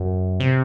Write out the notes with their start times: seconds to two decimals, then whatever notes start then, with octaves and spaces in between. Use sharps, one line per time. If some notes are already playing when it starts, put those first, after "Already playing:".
Already playing: F#2
0.40 C3